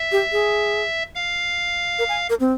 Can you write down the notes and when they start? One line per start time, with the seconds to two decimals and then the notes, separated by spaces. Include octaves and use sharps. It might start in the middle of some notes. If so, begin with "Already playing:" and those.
Already playing: E5
0.12 G4
0.32 G#4
1.15 F5
1.99 A#4
2.09 G#5
2.30 A#4
2.40 C4